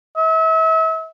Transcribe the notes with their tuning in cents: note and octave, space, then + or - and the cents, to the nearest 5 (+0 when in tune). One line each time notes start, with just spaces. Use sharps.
E5 -35